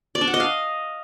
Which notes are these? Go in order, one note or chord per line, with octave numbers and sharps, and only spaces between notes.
D5
D4
F#5
D#5
F5